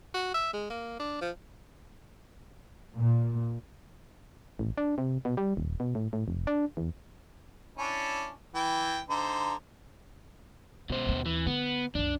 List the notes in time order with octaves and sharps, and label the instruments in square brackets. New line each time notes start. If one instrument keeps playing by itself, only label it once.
[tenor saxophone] F#4
E5
G#3
A#3
D4
F3
[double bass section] A#2
[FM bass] A1
D4
C3
B2
G3
D#1
B2
A2
A2
F1
D4
E2
[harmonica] C#4 D4 E4
E3 G5
D3 D#4 C5
[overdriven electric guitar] B2 C5 [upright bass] G#3
[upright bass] D#2 C4
[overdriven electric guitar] E3
[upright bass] D3 [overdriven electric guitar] B3
[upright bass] C2 F#2 [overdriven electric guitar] D4